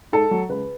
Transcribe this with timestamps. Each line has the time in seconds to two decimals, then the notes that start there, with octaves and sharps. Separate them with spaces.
0.12 G#2 A4
0.31 F#3
0.49 C#2 B4